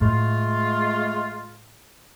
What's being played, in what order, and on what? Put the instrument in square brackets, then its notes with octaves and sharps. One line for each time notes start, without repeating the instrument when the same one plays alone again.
[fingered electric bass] A2 [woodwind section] G#3 A3 F4